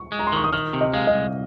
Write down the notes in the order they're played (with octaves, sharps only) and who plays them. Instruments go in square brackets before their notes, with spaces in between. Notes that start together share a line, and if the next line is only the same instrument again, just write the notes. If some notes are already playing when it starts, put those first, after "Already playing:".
Already playing: [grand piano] C#6
[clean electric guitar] G#3
[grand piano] A#5
C6
[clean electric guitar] D#3 [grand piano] C#6
[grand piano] D#6
[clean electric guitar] D#3 [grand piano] F6
[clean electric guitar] C3
[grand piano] D#5
[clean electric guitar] G#3 [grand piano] F5
[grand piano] D#5
[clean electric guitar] C2